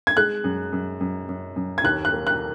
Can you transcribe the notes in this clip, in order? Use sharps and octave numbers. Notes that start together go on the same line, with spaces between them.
G#6
G#3 F#6
F#2
F#2
F#2
F#2
F#2
G#6
D#2 F#6
F#6
A#3
F#6